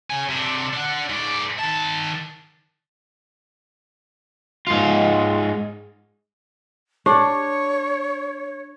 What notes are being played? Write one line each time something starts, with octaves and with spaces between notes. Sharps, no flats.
C#3 G#5
C3 D4
D4 F#5
G#2 D5
D#3 A5
G#2 F4
D4 G4 C#5